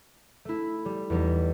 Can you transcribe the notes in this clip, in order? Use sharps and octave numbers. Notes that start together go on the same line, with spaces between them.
A3 E4
G3
E2 G3 D#4